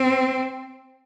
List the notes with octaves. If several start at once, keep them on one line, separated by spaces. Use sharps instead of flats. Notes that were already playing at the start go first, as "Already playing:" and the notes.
Already playing: C4